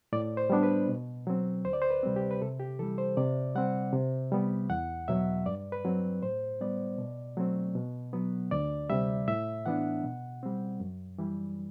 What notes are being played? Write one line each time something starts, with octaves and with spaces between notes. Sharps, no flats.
A2 D5
C5
G3 B3 D4
B4
B2
F#3 C4
D2 C5
D5
C5
B4
C3 G3 C4
G4
B4
C3 A4
G4
E3 G3 A4
C5
C3 D5
G3 C4 F#5
C3
G3 B3
E2 F#5
B2 F#3 E5
G2 D5
B4
F#3 C4
A2 C5
G3 B3 D5
B2
F#3 A3 C4
B2
F#3 B3
D2 D5
C3 G3 E5
A2 E5
E3 B3 D4 F#5
B2
G3 C4
F#2
E3 G3